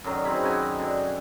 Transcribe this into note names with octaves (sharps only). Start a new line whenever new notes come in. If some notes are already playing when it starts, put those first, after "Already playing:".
F#2 D3 D#3 F#3
C4 D#4 G#4 B5
F#2 F#4 G5 G#5
D3